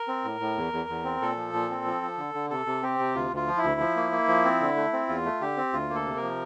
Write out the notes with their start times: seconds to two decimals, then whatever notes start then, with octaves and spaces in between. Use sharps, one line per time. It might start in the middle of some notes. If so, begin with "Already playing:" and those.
Already playing: A#4
0.08 C4
0.24 A2
0.40 A2
0.57 E2
0.73 E2
0.89 E2
1.04 C4
1.21 A#2 A4
1.37 F3
1.54 A#2
1.70 C4
1.86 F3
2.02 F3
2.18 D3
2.34 D3
2.50 C3 A4
2.66 C3
2.82 C4 G4
2.99 C3
3.15 D2 F4
3.31 D2 F4
3.47 F3
3.57 E4
3.63 D2
3.80 F3
3.96 A#3
4.12 A#3
4.28 F3
4.44 C4
4.61 D3
4.76 A3
4.93 C4
5.08 E2 F4
5.25 A3
5.41 D3 G4
5.57 C4
5.73 D2 F4
5.90 A#3
5.95 A4
6.06 C3
6.17 A#4
6.22 F3